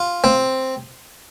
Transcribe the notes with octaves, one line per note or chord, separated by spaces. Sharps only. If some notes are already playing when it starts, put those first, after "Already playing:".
Already playing: F4
C4